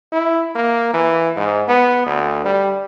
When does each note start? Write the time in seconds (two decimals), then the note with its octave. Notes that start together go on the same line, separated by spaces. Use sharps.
0.12 E4
0.55 A#3
0.93 E3
1.37 G#2
1.68 B3
2.06 D2
2.45 G3